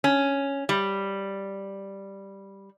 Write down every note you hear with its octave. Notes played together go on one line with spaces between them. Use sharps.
C#4
G3